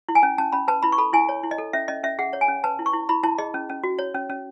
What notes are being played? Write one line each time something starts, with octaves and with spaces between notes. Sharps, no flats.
E4
G#5
C#4
C#4 A5
C#4 B5
B4 A5
E4 B5
C#6
A4 B5
E4 G#5
C#5
E4
D#5
A4
C#4 E5
C#4 D#5
C#4 E5
G#4 F#5
C#5
G#5
C#4
B4 A5
E4
C#6
E4
E4 B5
E4 A5
G#4 D#5
C#4
C#4
F#4
C#5
C#4
C#4